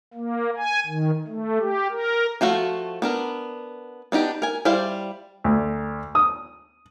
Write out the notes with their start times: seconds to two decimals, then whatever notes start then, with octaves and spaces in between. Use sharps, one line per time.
0.13 A#3
0.56 G#5
0.86 D#3
1.27 A3
1.59 G4
1.90 A#4
2.41 F3 A3 F4 F#4
3.02 B3 D4 A#4
4.12 B3 D4 D#4 G4
4.42 A#4 G#5
4.65 G3 E4 C5 D5 F5
5.44 D2
6.15 D#6